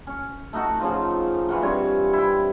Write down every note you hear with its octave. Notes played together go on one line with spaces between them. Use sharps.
C#4
A3 D#4 F#4
C#3 F3 F4
E3 F4 F#4
G2 C4 C#5
E4 G5